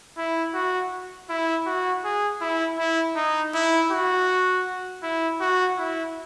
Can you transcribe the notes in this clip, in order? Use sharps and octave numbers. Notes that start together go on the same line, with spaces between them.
E4
F#4
E4
F#4
G#4
E4
E4
D#4
E4
F#4
E4
F#4
E4